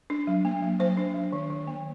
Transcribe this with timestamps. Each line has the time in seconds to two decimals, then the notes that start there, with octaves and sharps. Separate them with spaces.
0.10 D4
0.27 F#3
0.45 A#3
0.62 F#3
0.79 F#3 C5
0.97 D4
1.15 F#3
1.33 D#3
1.50 D#3
1.67 A#3